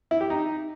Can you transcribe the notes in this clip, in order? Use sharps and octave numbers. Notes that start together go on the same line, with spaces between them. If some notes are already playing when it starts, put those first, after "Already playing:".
E4
G4
D#4